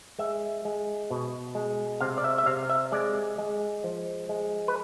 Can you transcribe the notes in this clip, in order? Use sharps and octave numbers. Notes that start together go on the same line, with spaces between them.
G#3 E5
G#3
B2
G#3
C3 F5
D5
E5
E5
C3 F5
E5
G#3 D5
G#3
F3
G#3
B4